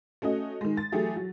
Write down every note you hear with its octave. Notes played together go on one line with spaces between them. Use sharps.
A3 C#4 F#4 D#5
D#3 G#3
A6
E3 F#3 A3 E4 G4 G#4
F#3